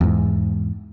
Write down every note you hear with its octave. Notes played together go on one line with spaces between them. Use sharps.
E2 G#2